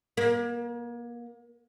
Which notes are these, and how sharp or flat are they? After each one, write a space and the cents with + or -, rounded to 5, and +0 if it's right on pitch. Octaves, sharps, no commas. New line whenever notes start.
A#3 +35